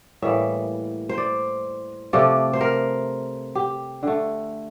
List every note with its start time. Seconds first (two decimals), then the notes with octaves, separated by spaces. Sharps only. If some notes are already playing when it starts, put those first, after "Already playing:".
0.22 A2 E3 G3 A#3 E5
1.09 C5
1.18 D5
2.13 C3 F3 A3 D5
2.53 C5
2.61 A#4
3.55 G4
4.03 D3 A3